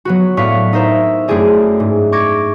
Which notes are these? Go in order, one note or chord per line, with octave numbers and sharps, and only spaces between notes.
F#3 B3 F#4
A2 B3 D5 F5 C#6 B6
D#4 A#4 C5 E5
F#2 A3 C4 E4 G#4 D5
G#2
C#6 D6 G#6 A#6 C#7